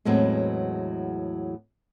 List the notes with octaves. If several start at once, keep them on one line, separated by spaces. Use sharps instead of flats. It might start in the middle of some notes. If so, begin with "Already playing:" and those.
E2 A2 F#3 G#3 B3 C4